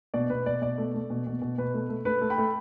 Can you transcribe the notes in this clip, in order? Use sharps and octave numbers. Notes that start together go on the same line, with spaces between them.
B2 D5
B2 B4
B2 D5
B2 D5
A3
A3
B2
B2
B2
B2 B4
A3
A3
A3 B4
A3
G5 B5
A3